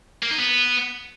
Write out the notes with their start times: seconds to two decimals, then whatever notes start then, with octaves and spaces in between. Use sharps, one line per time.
0.23 A#3
0.31 D#4
0.39 B3